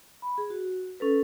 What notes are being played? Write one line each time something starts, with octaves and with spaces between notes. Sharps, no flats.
B5
G#4
F#4
C#4 A4 B4